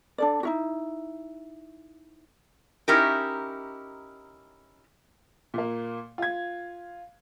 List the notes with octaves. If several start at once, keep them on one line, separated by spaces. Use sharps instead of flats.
D4 A4 D5
D#4 E4 F#4
C#4 D#4 E4 G4 A#4
A#2 A#3
F4 G#6